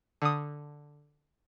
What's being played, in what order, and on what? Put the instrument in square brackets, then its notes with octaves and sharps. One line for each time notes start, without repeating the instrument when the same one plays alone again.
[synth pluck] D3 D#6